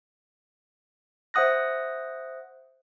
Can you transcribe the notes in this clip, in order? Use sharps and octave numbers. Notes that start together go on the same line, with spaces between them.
C5 E5 F#5 D#6 F#6 A#6